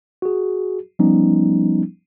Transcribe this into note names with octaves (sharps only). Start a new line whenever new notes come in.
F#4 G#4
F3 G3 B3 C#4 D#4